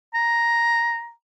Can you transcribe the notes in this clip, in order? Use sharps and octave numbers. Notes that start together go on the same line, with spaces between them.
A#5